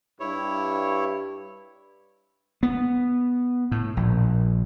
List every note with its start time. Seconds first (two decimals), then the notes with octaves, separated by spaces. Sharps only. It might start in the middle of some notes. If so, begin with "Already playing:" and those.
0.20 G2 E4 C#5
2.63 B3
3.72 A2
3.97 A#1